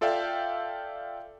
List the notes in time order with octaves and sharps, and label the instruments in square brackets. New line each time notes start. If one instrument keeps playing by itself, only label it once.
[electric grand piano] F4 A4 D5 E5 F5 G5